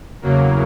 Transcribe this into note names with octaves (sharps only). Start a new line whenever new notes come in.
E2 C#3 F#3 A#3